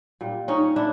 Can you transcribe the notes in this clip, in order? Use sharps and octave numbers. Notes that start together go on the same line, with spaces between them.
A#2 G3
C#4 D#4
D4 E4